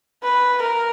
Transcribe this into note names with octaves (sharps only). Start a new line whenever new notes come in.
B4
A#4